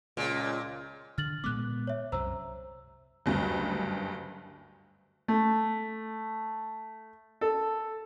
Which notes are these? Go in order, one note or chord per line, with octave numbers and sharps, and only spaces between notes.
C#2 A#2
D3 F6 A6 F#7
A#2 G#3 B3 D6 F#6
C#5 E5
C2 F#2 C3 C5 A#5 E6
F#1 D2 G2
A3
A4